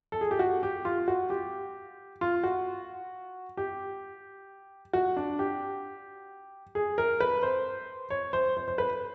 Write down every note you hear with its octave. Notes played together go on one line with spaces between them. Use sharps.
A4
G#4
G4
F#4
G4
F4
F#4
G4
F4
F#4
G4
F#4
D4
G4
G#4
A#4
B4
C5
C#5
C5
C5
C5
B4